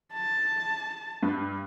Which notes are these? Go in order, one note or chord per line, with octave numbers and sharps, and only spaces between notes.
A5
G2